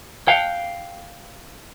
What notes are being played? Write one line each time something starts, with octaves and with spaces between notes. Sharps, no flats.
F5 G5